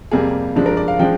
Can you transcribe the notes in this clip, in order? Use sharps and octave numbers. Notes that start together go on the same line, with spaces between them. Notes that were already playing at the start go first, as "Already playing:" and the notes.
F2 C3 G3 A#3 G#4
G2 F3 G#3 D4
A#4
D5
F5
F3 G#3 D4 G5